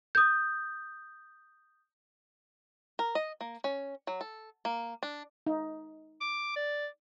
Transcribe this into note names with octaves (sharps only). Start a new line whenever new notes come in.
D#6 G6
A#4
D#5
A#3
C#4
F#3
A4
A#3
D4
D#4
D6
D5